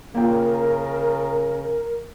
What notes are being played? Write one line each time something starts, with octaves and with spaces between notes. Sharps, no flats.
C#3 A#3 F4 A#4 G5